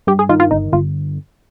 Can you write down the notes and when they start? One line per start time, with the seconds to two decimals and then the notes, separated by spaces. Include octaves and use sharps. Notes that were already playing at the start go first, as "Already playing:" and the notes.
0.07 G2 G4
0.19 G#4
0.29 D#3 F4
0.40 F4
0.51 G1 D#4
0.73 G1 F4